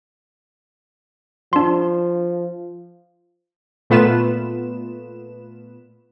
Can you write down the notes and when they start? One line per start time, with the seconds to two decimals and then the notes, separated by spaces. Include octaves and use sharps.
1.53 F3 D4 C6
3.90 A#2 A3 B3 F4 B4 E7